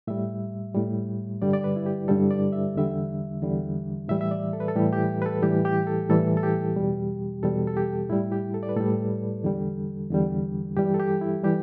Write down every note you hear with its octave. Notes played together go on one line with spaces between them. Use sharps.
A2 G3 E5
A2 G3
G2 D3 G3 D5
D5
B4
E4
G4
G2 D3 G3 A4
D5
E5
E2 D3 G3 E5
E2 D3 G3
A2 E3 G3 E5
E5
D5
A4
B4
A4
A2 E3 G3 G4
G4
B4
A4
A2 E3 G3 G4
G4
A4
A2 E3 G3 A4
A4
G4
E2 B2 G3
E2 B2 G3 A4
A4
G4
A2 G3 E4
G4
A4
D5
B4
A2 G3 A4
E2 D3 G3
E2 D3 G3
G2 E3 G3 G4
A4
G4
E4
E3 G3 G4